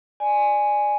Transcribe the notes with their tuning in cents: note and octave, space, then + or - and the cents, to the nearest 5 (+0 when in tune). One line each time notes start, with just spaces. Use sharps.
D5 +20 G#5 +0